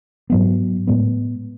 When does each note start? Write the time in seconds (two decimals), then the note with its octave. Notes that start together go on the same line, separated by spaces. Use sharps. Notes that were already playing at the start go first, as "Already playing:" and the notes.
0.30 G#2 F#3 B3
0.87 A2 G#3 B3